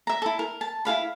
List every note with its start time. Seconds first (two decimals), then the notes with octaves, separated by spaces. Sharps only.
0.07 E5 A#5
0.22 E4 A4
0.39 A#4
0.61 A5
0.85 E4 G#4 F5 B5